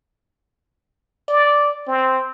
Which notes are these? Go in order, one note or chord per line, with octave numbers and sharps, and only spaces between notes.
D5
C4